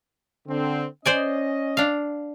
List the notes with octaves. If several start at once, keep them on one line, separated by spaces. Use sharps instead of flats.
D3 C4
C#4 C5 D5 D#5 G#5
D4 F5